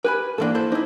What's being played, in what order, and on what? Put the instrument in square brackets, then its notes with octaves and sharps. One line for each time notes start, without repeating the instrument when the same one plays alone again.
[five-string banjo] G4 B4 [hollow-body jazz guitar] A#4 G#5 B5
[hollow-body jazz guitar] G#2 E3 D4 [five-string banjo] A#3 A4
[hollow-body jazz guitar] E4 C5 A5
[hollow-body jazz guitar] A#3 E4 [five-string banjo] D#4 C5